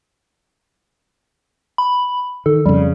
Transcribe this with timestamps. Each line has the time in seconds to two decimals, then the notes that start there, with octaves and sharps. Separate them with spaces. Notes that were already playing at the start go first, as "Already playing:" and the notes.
1.78 B5
2.46 D#3 A4
2.66 F2 C#3 G3